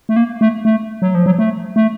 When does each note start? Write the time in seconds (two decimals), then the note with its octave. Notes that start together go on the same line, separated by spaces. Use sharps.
0.09 A3
0.16 A#3
0.41 A3
0.65 A3
1.02 F#3
1.15 F3
1.26 F#3
1.39 A3
1.76 A3